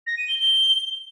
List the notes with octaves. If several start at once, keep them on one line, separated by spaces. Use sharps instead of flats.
A#6
D#7
G7
G7